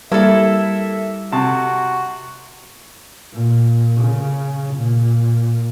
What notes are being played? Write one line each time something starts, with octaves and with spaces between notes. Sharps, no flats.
G3 A#3 E4 A4 E5
C3 F#4 A5
A#2
C#3
A#2